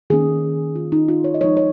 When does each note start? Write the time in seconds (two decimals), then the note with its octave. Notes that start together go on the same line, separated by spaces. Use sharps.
0.10 D#3 A#3 C#4 G#4
0.75 F4
0.92 D#4
1.08 F4
1.24 C#5
1.34 D#5
1.41 F3 G#3 D#4 C#5
1.57 C#5